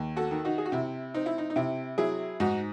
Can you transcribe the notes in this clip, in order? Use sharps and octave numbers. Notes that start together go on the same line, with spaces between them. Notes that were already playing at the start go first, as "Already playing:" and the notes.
Already playing: D#2
F#4 A4
D#3
D#4 F#4
G#4
F#4
C3 E4
C4 D#4
E4
D#4
D#4
C3 E4
F#3 E4 G#4
G#2 D#4 F#4